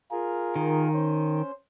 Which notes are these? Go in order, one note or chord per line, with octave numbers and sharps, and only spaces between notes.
F4 G#4 A#4
D#3
C#4 C5